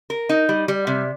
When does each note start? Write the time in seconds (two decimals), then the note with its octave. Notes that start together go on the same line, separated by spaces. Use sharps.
0.10 A#4
0.29 D#4
0.49 G3
0.68 G3
0.87 C3